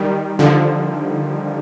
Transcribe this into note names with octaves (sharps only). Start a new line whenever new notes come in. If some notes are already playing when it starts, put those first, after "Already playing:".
Already playing: D#3 G3
D3 F3